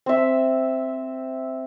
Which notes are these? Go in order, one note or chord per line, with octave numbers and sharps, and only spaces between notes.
C4 E5